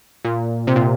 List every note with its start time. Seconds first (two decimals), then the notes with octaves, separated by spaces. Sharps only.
0.25 A#2
0.67 C3
0.76 A#2